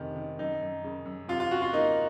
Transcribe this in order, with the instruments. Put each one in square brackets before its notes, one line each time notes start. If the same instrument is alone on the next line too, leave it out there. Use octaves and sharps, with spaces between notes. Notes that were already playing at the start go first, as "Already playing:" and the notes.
Already playing: [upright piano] F1 C3 D#3
D#3
[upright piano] F#2 [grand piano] D#4
[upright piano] F#2
C#3
F#2
[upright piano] C3 [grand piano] F4
[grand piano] F4
[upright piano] C#4 [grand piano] F#4
[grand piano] F4
[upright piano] A#3 [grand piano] D#4